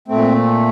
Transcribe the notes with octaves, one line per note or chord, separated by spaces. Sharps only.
A#2 A3 C4